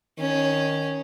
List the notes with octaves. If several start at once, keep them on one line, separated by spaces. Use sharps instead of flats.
D#3 C#4